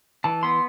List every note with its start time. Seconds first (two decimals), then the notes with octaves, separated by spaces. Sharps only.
0.24 E3 A5
0.43 B3 C6